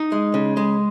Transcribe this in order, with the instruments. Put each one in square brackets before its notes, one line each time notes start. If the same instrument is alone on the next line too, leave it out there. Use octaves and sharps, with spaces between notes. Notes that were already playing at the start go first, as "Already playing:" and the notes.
Already playing: [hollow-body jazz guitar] D#4
G#3
C#3
G#3